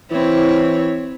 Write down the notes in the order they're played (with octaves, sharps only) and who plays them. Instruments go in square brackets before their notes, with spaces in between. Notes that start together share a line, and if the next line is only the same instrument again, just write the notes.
[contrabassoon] E3 [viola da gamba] C4 E4 C#5